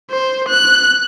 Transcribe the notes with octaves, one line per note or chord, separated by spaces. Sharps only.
C5
F#6